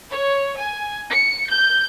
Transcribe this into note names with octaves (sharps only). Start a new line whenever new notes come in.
C#5
G#5
C#7
G6